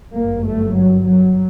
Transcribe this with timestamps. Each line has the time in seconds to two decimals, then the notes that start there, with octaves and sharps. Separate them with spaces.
0.13 G1 F#2 A#3
0.45 A3
0.75 F#3
1.07 F#3